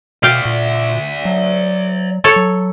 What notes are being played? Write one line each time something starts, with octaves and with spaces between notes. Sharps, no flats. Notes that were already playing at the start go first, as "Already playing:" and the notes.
B2 D5 E5 F5 G5
A#2
F#3
A4 C#5 A5
F#3